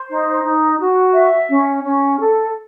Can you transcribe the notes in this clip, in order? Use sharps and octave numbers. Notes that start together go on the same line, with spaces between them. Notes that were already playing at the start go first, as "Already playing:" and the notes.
Already playing: C5
D#4
D#4
F#4
E5
C#4
C#4
A4